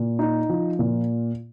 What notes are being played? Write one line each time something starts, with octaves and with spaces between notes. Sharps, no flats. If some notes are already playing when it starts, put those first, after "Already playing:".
Already playing: A#2
D#4
F3
A#2